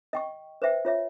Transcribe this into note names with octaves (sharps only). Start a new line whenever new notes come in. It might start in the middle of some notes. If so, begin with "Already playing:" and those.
D#5 G5 C#6
B4 C5 E5 G5
F4 C#5 E5